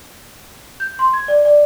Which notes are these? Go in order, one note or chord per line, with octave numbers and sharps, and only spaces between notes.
G6
C6
G#6
D5
D5